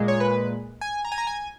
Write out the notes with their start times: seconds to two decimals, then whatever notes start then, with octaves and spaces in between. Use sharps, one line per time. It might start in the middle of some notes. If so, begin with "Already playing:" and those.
Already playing: A#2 G#3
0.08 C#5
0.20 B4
0.81 G#5
1.05 A#5
1.12 G#5
1.18 A#5
1.27 G#5